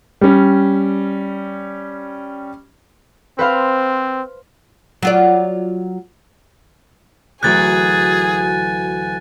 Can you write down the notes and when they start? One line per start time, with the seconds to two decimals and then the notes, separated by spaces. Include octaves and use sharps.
0.21 G3 C#4
3.39 C4 B4 C5 F5
5.03 F#3 F4 D5
7.43 D2 E3 F#3 G#4 G#5 F#6 A6